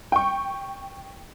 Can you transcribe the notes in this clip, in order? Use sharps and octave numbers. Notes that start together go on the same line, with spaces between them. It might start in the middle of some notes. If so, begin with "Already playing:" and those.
G5 C#6